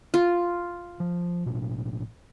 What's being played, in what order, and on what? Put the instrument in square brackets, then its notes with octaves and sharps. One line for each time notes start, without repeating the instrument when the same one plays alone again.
[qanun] F4
[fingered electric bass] F3
A1 B2